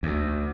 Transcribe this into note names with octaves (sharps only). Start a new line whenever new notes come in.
D2